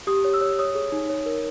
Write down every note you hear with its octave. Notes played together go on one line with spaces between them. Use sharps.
G4 D#6
C#5
E6
C#5
C#5 D#6
G#4
D#4
C#5
A#4